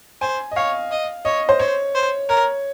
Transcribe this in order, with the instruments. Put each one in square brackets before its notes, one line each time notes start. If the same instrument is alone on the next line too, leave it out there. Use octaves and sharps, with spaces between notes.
[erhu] C5 [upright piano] G#5
[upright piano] D#5
[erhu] C#5 [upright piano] F5
[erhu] D#5
[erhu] C#5 [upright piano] D#5
[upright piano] C5
[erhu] C5 [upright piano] C#5
[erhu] C5
[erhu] A#4 [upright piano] C#5